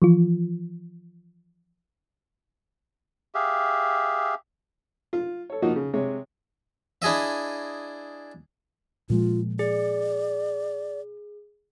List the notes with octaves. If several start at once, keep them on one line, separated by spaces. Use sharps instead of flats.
E3 F3 F4
G4 G#4 E5 F5
F4
A4 C#5
F3 A#3 D#4 F4 F#4
C#3
C3 G#3 C#5
D4 E4 G#4 D#5 E5
A#2 F3 G#3 F4
G#4 D5